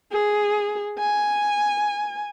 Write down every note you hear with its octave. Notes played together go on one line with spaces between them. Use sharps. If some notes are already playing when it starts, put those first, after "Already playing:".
G#4
G#5